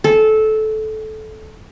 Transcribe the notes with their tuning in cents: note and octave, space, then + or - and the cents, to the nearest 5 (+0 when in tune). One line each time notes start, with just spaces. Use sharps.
A4 -15